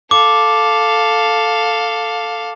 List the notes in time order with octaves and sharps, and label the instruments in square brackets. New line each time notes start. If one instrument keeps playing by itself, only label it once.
[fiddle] A4 F5 [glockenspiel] D6